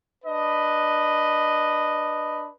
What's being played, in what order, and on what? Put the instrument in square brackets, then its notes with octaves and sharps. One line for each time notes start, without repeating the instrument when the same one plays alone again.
[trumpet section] D4 B4 D#5